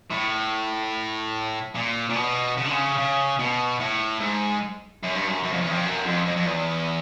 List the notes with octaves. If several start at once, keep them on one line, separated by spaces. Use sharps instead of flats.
A2
A#2
A#2
B2
C#3
D3
C#3
C#3
B2
A2
G#2
F#2
G2
F#2
F#2
F2
E2
F2
F#2
F2
F2
F2
E2